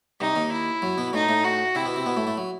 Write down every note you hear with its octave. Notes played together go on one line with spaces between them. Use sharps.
C2 C3 D#4
D#2 D#3
E4
F#2 F#3
B2 B3
A2 A3 D#4
A2 A3
F#4
C3 C4 E4
B2 B3
C3 C4
B2 B3
A2 A3
A2 A3
F#3